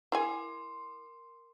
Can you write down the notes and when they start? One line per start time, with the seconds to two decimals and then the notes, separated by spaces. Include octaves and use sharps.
0.12 E4 G#4 A#4 G#5 C6